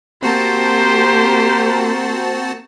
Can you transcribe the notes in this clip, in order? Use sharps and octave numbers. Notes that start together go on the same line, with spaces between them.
A#3 C4 F#4 G4 C5 A5